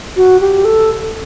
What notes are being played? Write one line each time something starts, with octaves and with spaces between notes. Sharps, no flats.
F#4
G4
A4